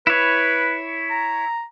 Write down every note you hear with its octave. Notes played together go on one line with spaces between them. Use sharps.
E4 B4 C#5
A#5